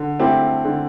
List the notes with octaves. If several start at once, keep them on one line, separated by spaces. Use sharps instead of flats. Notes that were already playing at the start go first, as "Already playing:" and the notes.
Already playing: D3
A3 C4 E4 G4
D3